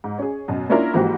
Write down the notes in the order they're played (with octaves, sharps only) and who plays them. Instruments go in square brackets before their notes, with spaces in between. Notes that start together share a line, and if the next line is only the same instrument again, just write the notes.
[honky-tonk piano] G#2
C#4 G#4
F#2 B2 D#5
A#3 C#4 D4 E4 F4 A#4
G#2 E3 F3 A#3 F#4 G4